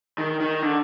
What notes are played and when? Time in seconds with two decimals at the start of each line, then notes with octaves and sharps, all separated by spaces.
0.18 D#3
0.40 D#3
0.62 D3